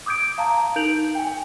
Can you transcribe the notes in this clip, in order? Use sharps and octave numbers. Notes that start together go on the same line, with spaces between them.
D6 D#6 G6 G#6 D7
F5 A5 A#5
D#4 A#4 G6 D7 F7 F#7
G5 G#5